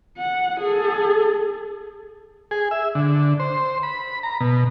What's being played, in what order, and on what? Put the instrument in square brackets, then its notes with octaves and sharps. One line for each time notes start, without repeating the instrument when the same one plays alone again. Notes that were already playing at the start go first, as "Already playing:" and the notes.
[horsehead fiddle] F#5
G#4 A4
[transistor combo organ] G#4
E5
D3
C5
B5
A#5
B2